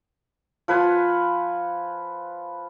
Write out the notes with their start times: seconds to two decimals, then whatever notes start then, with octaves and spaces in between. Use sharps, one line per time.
0.68 F3 B4 F#5 G#5